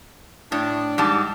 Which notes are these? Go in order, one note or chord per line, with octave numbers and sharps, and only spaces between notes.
A2 D4
G#2 G3 A5